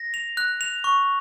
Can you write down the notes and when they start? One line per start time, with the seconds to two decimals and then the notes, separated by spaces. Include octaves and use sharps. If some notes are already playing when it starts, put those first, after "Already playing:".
Already playing: A#6
0.14 F7
0.37 F#6
0.61 F7
0.84 C#6